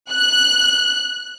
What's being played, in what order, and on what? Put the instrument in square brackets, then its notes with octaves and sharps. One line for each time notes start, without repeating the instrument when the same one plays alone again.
[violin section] F#6